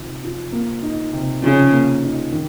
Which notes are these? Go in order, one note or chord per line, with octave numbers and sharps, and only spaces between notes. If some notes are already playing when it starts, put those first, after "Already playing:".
Already playing: C3 F3 D#4
F3
A#3
D#4
C3
C#3 F3
A#3
D#4
D#3